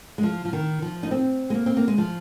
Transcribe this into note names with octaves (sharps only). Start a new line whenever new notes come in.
G#3
F3
F3
D#3
F3
D#4
C4
G#3
A#3
C4
A#3
G#3
F3